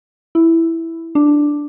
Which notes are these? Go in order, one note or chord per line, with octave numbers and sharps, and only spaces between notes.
E4
D4